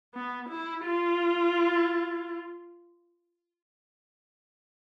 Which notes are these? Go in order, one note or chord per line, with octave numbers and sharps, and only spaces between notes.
B3
E4
F4